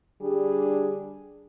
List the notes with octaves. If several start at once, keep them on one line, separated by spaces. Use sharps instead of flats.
D3 G3 D4 G4 G#4